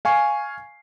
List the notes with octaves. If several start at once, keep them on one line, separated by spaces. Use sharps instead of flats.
F5 G#5 C#6 C7